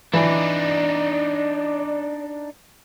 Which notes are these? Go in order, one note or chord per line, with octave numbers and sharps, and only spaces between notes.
E3 D4 D#4 D5